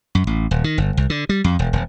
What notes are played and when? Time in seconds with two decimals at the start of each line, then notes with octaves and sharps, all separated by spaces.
0.15 F#2
0.27 A1
0.51 D#1
0.64 D#3
0.78 G1
0.97 C2
1.10 D3
1.29 G3
1.44 F2
1.59 E1
1.73 E1